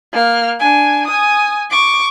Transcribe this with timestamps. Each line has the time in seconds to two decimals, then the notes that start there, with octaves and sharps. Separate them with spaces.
0.13 A#3 F6
0.59 D4 G#5
1.07 G#5 D#6
1.70 C#6 D6